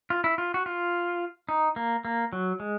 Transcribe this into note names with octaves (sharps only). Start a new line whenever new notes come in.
F4
E4
F4
F#4
F4
D#4
A#3
A#3
F#3
G#3